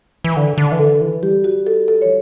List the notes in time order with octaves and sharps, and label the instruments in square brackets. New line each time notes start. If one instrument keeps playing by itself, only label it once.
[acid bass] E3
D3
D3
E3
[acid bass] D3 [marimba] A4
[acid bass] E3
[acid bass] G3 [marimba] G4
[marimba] F#4
A4
A4
[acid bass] E3 [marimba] C#5